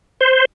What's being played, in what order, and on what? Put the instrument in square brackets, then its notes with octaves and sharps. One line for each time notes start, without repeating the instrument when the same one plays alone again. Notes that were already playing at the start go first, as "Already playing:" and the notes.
[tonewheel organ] C5